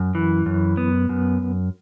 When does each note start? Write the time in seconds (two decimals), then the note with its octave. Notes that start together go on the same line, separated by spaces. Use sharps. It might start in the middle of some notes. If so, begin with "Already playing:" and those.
Already playing: F#2
0.15 E3
0.46 F#2
0.77 B3
1.09 F#2